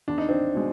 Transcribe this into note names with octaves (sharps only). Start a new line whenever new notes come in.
E2 D4
D#4
C4 D4
B2 G#3